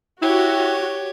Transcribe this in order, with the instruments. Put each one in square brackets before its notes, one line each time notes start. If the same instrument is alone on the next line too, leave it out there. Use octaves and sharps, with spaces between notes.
[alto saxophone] E4 [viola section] F#4 [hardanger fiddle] G4 C#5 [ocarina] G5